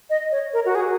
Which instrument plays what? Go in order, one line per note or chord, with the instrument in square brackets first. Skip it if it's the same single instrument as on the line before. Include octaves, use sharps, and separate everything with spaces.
[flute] D#5
C#5
A#4
F#4
G#4